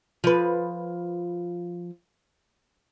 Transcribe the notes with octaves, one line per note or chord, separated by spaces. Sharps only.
F3 B4